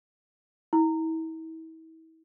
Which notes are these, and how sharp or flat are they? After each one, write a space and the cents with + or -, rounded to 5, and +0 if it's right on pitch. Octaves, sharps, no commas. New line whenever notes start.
E4 -35